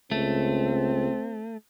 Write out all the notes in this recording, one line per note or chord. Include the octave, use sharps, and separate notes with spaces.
C#2 A3 C4